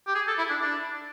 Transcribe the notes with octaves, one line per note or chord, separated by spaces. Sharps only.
G4
G#4
A4
E4
D4
D4